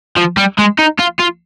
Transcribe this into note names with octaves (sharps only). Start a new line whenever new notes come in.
F3
G3
G#3
D#4
F4
F4